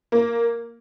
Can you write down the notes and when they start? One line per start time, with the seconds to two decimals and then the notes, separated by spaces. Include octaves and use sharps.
0.12 A#3